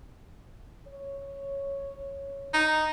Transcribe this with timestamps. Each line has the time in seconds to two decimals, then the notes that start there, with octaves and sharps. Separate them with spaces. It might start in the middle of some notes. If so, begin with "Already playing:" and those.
0.87 C#5
2.54 D#4